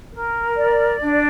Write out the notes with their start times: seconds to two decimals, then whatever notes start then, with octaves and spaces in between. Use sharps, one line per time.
0.12 A#4
0.56 D5
1.01 D4